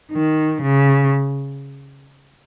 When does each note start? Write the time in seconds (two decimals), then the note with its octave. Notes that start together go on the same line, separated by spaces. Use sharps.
0.12 D#3
0.62 C#3